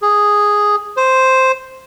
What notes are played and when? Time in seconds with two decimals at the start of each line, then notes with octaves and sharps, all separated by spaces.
0.02 G#4
0.97 C5